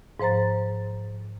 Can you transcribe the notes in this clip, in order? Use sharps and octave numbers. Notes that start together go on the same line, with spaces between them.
G#2 F3 C5 A#5 A6